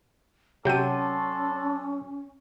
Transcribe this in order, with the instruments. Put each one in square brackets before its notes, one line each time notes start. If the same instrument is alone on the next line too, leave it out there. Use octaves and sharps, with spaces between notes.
[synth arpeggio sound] C3 D#7 [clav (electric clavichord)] F#3 G5 [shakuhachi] C#4 [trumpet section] D4 A4 C6